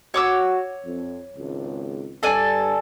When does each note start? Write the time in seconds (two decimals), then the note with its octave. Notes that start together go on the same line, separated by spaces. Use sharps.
0.14 F#4 C#5 D6 E6
0.85 F2
1.36 G#1 C#2
2.23 G2 A4 D5 G#5